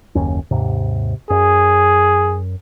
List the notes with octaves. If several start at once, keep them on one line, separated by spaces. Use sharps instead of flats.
F#1 D#2 C#4
D#2 G#2 C3
F#2 G#4